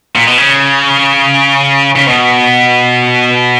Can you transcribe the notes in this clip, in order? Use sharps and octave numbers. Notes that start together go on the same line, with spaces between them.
A#2
B2
C#3
C#3
B2